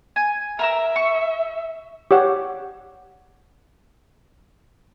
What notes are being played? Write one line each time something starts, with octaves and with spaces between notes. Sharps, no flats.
G#5
A#4 E5 A#5 E6
C#6
G4 C#5 F#5